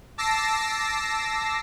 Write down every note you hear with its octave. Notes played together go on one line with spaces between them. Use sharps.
A5 D6 E6 A#6 C7